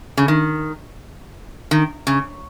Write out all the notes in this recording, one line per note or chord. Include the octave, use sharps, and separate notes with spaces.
C#3
D#3
D#3
C#3